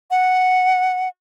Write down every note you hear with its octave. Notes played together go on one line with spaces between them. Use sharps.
F#5